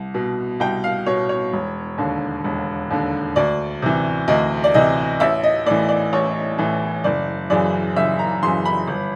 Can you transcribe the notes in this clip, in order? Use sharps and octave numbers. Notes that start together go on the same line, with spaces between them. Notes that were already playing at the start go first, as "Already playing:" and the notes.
Already playing: C2
B2
C2 G5
F5
B2 C#5
C#5
E1
D#2 D3
E1
D#2 D3
D2 D5
C3 E3
D2 D#5
D5
C3 E3 D#5
A1 E5
D#5
A2 E3 D5
D5
A1 C#5
A2 E3
F#1 D5
F#2 C#3 E3 D5
F#1 E5
A#5
F#2 C#3 E3 C6
B5
G1